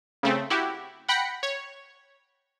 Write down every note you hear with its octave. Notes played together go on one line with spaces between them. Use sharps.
C#3 A3 C4
E4 F#4 G4
F#5 G5 B5 A#6 B6 C#7
C#5